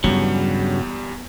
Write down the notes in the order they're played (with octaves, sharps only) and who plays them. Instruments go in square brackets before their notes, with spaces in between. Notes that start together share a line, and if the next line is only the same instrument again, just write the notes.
[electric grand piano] E2 G3 [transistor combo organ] G2 C#3 [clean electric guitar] F#3 [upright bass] B3